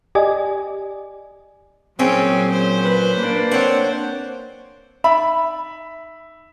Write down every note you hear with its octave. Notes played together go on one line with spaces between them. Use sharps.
G4 D5 D#5 G#5
A#2 F#3 C4 C#4 G#4
C5
B4
A#3 D4
C4 C5 C#5 F#5
D#4 D5 E5 B5